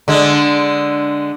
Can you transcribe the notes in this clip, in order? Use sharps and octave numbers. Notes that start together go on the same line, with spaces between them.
D3 G#3